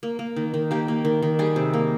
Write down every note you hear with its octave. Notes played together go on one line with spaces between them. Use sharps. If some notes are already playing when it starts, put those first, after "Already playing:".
A#3
A#3
D#3
D#3
A#3 G4
A#3
D#3
D#3
G3 G#4
C3
A#3